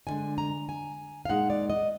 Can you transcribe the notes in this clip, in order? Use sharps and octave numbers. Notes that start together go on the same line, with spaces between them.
D#2 D3 G#3 D4 G#5
A#5
G#5
F5
A#2 G#3 D#4 F#5
D5
D#5